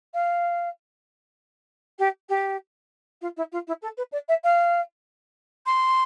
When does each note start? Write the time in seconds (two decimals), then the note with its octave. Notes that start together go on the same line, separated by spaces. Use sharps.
0.14 F5
1.98 G4
2.29 G4
3.21 F4
3.36 E4
3.52 F4
3.67 E4
3.82 A4
3.97 B4
4.12 D5
4.28 E5
4.44 F5
5.66 C6